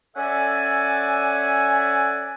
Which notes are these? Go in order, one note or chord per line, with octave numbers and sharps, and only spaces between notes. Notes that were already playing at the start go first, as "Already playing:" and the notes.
C#4 A4 D5 E5 F#5 G#5